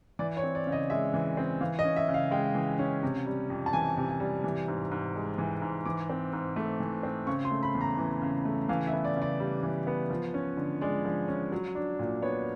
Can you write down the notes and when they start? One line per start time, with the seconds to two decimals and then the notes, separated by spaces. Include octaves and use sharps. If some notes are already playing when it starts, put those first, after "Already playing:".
0.19 E3 D5
0.37 C#5
0.43 C4
0.55 D5
0.67 C#3
0.72 D#5
0.90 G#3 E5
1.14 E3
1.37 C4
1.61 E3 F5
1.79 D#5
1.84 C#4
1.96 E5
2.08 C#3
2.14 F5
2.31 G#3 G5
2.55 E3
2.79 C#4
3.03 C3
3.26 G3
3.50 F2
3.66 A5
3.73 E3 G#5
3.97 C3
4.09 G#5
4.20 G3
4.44 E3
4.68 G#2
4.91 G#2
5.15 G#3
5.38 E3
5.62 G#2
5.86 E3 D6
6.09 C4
6.33 G#2
6.56 A3
6.80 E3
7.03 C4
7.27 C#3 C#6
7.45 C6
7.51 A3
7.63 B5
7.75 E2
7.81 A#5
7.98 E3
8.21 C#3
8.45 A3
8.69 E3 F5
8.87 E5
8.93 B3
9.05 D5
9.16 C#3
9.22 D5
9.40 G3
9.63 E3
9.87 B3
10.10 F3
10.34 C#4
10.57 D3
10.81 G#3 D5
11.05 F3
11.28 C#4
11.52 F#3
11.75 D4
11.99 A#2
12.22 B3 C#5